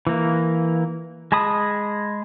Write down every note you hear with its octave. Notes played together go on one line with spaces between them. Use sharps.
E3 A#3
G#3 A5 B5 D#6